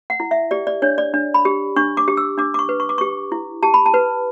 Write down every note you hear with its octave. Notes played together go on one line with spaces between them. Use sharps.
F#5
E4
E5
G4 D5
D5
D4 C#5
D5
D4
B5
G4
D4 C#6
D6
G4
E6
D4 D6
D6
C#6
B4
C#6
D6
G4 C#6
E4
G4 A5
B5
A5
B4